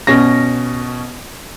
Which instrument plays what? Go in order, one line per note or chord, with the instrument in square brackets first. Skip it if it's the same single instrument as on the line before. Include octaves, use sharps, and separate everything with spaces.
[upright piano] B2 C#4 A#6